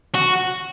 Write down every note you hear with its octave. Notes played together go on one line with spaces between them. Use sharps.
F#4